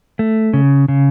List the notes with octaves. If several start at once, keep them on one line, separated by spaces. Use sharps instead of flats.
A3
C#3
C#3